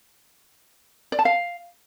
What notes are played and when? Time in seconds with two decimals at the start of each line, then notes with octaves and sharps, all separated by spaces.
1.12 D5
1.19 A5
1.25 F5